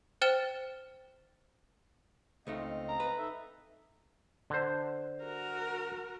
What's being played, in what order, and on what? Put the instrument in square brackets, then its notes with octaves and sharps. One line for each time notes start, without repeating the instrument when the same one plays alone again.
[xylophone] C5 G5 F6 A6 E7 G7
[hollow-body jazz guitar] C#2 A3 D#4 [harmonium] C4 D#5 F5
[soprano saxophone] A#5
[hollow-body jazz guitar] B4
[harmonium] D#4 A4 E5
[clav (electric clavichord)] D3 C5
[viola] F#4 A#4